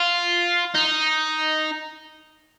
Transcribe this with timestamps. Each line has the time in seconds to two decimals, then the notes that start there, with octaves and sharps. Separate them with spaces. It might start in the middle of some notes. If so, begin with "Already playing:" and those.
Already playing: F4
0.75 D#4